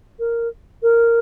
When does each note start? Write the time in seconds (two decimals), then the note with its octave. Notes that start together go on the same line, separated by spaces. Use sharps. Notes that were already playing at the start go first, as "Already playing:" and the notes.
0.19 A#4
0.83 A#4